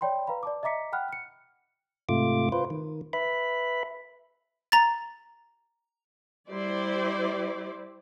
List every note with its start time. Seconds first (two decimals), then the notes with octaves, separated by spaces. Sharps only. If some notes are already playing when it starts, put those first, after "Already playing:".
0.01 C#5 D5 G5 B5 C6
0.27 B4 F5 A#5 B5
0.43 D5 A5 D6
0.63 D#5 E5 A#5 D6 B6 C#7
0.92 F#5 G5 B5 F6 F#6
1.09 F6 C#7
2.09 G#2 C3 A3 F4 D6
2.52 F4 B4 C5
2.70 D#3
3.13 B4 E5 B5
4.72 A#5 A6
6.49 G3 E4 G4 C5 D5